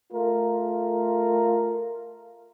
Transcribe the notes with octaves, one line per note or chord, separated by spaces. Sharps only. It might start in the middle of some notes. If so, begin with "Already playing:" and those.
A3 F4 A#4